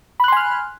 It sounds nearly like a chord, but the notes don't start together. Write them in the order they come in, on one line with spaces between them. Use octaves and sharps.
B5 F#6 C6 G#5 F6